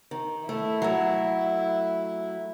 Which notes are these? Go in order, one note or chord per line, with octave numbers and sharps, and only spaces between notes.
D#3
A3 E4
F#3 A3